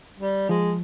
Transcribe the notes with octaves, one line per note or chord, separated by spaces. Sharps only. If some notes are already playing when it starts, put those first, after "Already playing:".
G3
F3 G#3